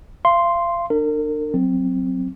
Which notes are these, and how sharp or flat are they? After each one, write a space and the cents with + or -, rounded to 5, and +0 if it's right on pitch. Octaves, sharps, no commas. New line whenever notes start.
F5 -35 C6 +0
D4 +30 A#4 -35
F#3 +0 C4 +0